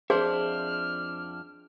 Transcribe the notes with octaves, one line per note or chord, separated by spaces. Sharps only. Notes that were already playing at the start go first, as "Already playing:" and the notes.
F2 D4 G#4 C5 E5 F6